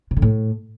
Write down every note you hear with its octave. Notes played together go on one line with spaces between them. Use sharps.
C3
D3
A2